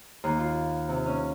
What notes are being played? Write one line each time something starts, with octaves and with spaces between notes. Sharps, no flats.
D#2
F4
C3
C#4